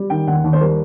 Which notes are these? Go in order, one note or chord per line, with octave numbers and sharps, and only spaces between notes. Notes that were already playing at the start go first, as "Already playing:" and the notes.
Already playing: G3
D#3 G5
D#2 F#5
D#2
C5
G3 A#4